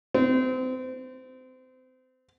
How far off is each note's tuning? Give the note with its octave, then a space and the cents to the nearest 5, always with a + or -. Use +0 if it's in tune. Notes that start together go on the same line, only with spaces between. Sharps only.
C4 -30